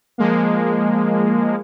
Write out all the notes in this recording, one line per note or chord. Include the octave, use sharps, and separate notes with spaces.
F3 G#3 A#3